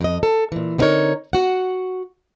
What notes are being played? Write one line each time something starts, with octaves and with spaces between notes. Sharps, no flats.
F2 D#5
A4
A#2 E3
D3 B3 C4 D#4 A#4 C#5
F#4 F#5